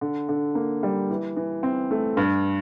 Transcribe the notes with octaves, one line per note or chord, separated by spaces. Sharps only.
D3
D3
A#3
G3
E3
E3
C4
A3
G2